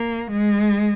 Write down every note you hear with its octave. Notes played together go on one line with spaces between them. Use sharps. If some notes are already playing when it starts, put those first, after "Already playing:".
Already playing: A#3
G#3